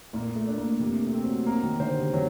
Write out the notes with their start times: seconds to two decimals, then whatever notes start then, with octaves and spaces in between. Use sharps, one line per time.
0.13 A#2 A#3
0.35 A3
0.47 D4
0.58 A#3
0.80 C3 A#3
1.02 A3
1.13 C4
1.25 F#3
1.47 F#3 A#3
1.63 D#3
1.79 D3 C5
1.97 C3
2.13 F#3